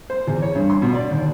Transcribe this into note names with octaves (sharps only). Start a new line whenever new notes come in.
C5
E2
C#5
G2
C6
B2
D5
D#2